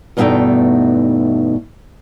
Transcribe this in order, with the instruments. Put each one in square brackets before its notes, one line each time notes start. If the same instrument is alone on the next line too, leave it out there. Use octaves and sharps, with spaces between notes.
[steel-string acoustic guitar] E2 G2 B2 A3 D#4 G5